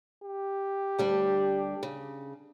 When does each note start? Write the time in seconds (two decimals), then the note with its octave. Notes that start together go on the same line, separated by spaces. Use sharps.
0.24 G4
0.99 D2 G3 D4
1.83 C#3